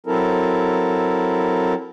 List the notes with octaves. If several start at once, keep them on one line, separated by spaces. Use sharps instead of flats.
F#3 C4 E4 A4 A#4